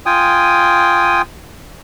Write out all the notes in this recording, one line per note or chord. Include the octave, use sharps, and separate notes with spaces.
F4 G5 G#5 D#6